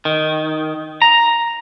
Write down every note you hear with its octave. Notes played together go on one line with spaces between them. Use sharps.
D#3
A#5